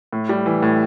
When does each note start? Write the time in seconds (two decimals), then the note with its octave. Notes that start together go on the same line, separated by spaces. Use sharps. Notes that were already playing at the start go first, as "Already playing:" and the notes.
0.13 A2
0.29 G3
0.46 E3
0.63 A2